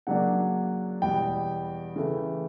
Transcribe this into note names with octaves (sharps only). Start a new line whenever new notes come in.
C#3 F#3 A#3 D4 F#5
E2 B2 G3 B3 G5
C#3 E3 A3